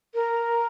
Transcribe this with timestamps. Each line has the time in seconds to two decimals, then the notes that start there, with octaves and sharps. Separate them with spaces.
0.14 A#4